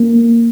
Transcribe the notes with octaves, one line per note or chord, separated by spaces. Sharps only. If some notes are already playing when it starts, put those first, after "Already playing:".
Already playing: A#3